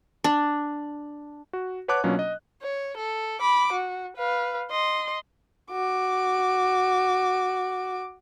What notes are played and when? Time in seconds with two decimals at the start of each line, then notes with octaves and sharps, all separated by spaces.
0.24 D4
1.53 F#4
1.88 B4 C#5 F#5 A5 D6 F#6
2.04 B2 F#3 A#3 C#4 D4 F4
2.19 D#5
2.62 C#5
2.97 A4
3.41 B5 D6
3.73 F#4
4.17 B4 F5
4.71 D#5 C6
5.72 F#4 D6